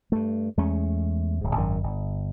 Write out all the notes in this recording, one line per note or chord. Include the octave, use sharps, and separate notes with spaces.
G2 A3
E2 G#3 A3 C#4
D1 G#2
G#1 F#2 D#3
G1